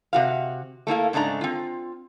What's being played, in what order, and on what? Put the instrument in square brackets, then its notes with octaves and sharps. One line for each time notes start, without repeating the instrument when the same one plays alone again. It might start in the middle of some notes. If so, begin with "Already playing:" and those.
[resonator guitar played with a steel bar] C3 F#4 F5
A3 A#3 E4 F5
G#2 C#3 A3 D4 A#5
C4 F4